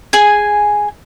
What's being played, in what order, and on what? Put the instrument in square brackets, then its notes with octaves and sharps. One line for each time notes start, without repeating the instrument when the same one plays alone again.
[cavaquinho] G#4 G#5